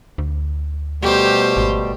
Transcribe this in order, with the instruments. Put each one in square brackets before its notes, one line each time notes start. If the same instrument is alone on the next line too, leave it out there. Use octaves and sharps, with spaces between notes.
[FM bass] D2
[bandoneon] B2 G3 A3 [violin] G4 C5
[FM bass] G#1